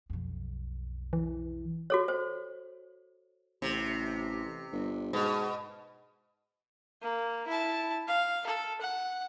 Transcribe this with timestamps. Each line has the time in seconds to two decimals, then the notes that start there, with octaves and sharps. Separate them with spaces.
0.10 B1 F2
1.13 E3
1.90 F#4 A4 C#5
2.08 C5
3.62 A1 C3
4.72 G1
5.13 G#2 B2
7.02 A#3
7.47 E4 A5
8.07 F5
8.47 A4
8.81 F#5